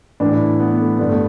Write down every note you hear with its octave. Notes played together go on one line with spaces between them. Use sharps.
A2 E3 D4
E4
B3
A3
G2 D3 B3
A3